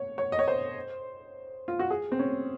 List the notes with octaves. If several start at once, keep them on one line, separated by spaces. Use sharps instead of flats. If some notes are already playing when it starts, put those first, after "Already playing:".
Already playing: C#5
C#5
D#5
C#5
C5
F4
F#4
G#4
C4
C#4